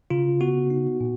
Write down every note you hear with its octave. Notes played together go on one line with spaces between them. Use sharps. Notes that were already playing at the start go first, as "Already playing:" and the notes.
C#3 F4
B3 F#4
D#4
A#2